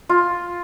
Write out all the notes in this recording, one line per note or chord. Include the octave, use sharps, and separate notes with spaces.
F4